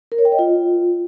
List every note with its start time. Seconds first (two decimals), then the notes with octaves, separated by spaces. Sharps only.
0.12 A#4
0.18 C#5
0.25 G5
0.32 D#5
0.39 F4